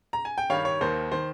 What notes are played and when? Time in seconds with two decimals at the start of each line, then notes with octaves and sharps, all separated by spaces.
0.13 A#5
0.25 G#5
0.38 G5
0.50 G2 D#3 G3 C#5 F5
0.65 C#5
0.81 D#2 D#3 A#3 C5
1.12 D#3 C5